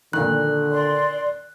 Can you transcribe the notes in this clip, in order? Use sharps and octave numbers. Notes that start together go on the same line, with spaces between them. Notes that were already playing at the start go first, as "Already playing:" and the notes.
A#2 D3 D#3 F#6
D5 C6